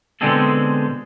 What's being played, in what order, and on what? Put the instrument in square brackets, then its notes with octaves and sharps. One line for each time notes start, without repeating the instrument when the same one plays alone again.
[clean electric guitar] B2 D3 G#3 C4 G#4 A4